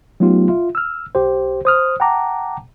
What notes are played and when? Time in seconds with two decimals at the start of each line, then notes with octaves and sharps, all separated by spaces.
0.20 F#3 A3 B3 D#4 F4 G4
0.49 F4 E5
0.75 E6 F6
1.15 B1 G4 C5
1.65 C5 D#6 F6
2.00 F#5 G5 A5 A#5 D6